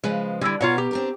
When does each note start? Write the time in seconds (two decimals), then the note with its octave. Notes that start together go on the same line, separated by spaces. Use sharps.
0.04 C#3 F3 G#3 B4
0.41 D3 G3 E4
0.61 B2 F4 A#4 C#5 F#5
0.78 G4
0.91 C4 D4 A#4